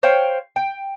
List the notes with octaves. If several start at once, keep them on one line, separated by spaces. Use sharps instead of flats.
C5 C#5 F5 G5
G5